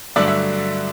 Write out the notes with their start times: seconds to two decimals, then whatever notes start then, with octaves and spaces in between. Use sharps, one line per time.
0.16 G2 D3 F#3 A3 D4 D5 E5
0.28 E5